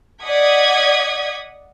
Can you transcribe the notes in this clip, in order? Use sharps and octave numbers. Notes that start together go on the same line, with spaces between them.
D5 D#5 F#5 D#6 G#6 B6